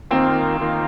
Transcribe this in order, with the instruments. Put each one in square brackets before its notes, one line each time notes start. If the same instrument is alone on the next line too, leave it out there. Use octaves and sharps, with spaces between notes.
[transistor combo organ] D#3 A#3 F4 [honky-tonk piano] C4
[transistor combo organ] D#3 A#3 F4